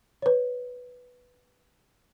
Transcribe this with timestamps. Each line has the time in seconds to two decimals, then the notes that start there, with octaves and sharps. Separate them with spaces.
0.22 B4 C#5